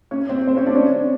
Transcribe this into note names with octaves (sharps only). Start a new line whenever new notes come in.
C#4 C#5
C4 C5
C4 C5
C#4 C#5
D4 D5
C#4 C#5